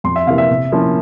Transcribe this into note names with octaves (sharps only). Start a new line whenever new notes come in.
F2 C6
E5
C3 E3 A#3 F5
E5
C3
F3 A#3 C#4 E4